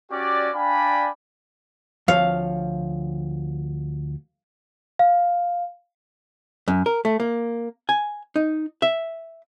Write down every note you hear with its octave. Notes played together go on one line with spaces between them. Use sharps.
C#4 F#4 G4 D5
D4 D5 F5 G5 G#5 B5
D2 F3 C#5 F5
F5
F#2
A#4
A3
A#3
G#5
D#4
E5